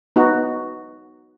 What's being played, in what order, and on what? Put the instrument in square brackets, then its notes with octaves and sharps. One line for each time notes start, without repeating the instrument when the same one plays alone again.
[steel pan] B3 D#4 F#4